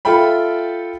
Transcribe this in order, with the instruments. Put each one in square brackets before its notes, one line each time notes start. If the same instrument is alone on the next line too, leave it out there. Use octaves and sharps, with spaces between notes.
[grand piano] F4 A4 E5 G5 B5